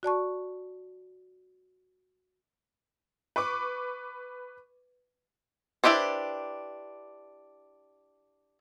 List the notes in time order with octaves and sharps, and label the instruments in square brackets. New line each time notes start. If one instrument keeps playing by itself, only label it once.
[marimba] F#4 D5 A5 C#6
[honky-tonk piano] B4 C#6 D6
[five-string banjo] D4 E4 G4 B4 C5